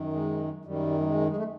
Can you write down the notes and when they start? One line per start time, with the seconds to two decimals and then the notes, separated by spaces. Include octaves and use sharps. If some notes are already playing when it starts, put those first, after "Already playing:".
Already playing: F#2 D#3
0.13 G#3
0.65 F#2 D#3 G3
1.00 G3
1.04 G#3
1.29 G#3
1.36 A3